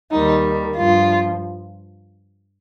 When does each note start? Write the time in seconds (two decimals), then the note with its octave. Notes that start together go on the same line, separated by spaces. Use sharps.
0.11 D#2 D#3 G3 D#4
0.76 G2 F3 F4